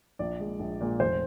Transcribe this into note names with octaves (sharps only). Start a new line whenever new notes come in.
A#1 D5
A#2 G#3
A#1
A#2 G#3
F1 C5